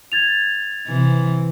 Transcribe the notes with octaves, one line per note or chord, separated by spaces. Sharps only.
G#6 A6 F7
C3 E3